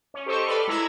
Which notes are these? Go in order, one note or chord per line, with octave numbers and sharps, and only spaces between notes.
C#4
G4 A4 C5 D#5 C#6
A4 B4 D5 B5 C6 F6
G#3 E4 A#5 B5 E6 G#6